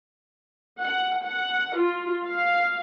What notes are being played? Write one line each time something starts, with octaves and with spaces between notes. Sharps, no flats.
F#5
F#5
F4
F5